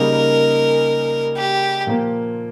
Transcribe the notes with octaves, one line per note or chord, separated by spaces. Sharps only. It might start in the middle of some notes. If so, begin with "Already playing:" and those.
Already playing: C#3 G3 A#3 D#4 G#4 A#4
G4
A#2 F3 A#3